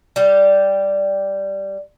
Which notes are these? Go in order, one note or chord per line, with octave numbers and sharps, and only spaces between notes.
G3 G4